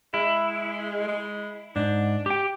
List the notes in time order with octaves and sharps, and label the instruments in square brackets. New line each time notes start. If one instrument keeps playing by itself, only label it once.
[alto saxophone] G#3 [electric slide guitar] E4
[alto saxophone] G#3
[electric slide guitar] G#2 [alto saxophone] D4
[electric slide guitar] G4 G5